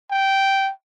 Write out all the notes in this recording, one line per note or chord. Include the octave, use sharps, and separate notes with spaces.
G5